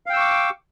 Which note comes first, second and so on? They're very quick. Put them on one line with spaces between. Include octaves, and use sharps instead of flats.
F5 G5 E6 C#6 D6